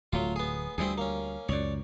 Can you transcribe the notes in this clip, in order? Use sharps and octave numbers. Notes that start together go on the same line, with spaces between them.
D1 F#3 A3 F4
B3 G#4
D2 G3 C4 E4 G#4
A#3 C#4
C#2 F#2 C#5 D5